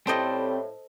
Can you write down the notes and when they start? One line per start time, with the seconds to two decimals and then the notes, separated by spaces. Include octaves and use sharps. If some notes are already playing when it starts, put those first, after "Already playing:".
0.07 A2 G3 C4 A4 C5 D#5 G5